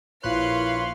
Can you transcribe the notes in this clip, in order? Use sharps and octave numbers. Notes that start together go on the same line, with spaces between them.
A#1 E4 B4 C#5 F5 C6 F#6